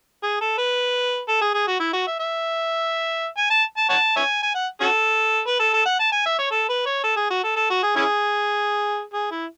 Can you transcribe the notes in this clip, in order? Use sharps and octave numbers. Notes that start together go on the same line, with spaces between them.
G#4
A4
B4
A4
G#4
G#4
F#4
E4
F#4
E5
E5
G#5
A5
A5
C#5 F#5 A5
C#5 E5 G#5
G#5
F#5
C#4 F#4 A4
B4
A4
A4
F#5
A5
G#5
E5
C#5
A4
B4
C#5
A4
G#4
F#4
A4
A4
F#4
G#4
C#4 E4 G#4
G#4
E4